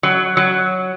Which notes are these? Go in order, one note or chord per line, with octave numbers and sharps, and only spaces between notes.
F#3
F#3